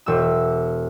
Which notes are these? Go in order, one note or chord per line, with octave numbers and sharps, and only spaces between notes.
E1 E6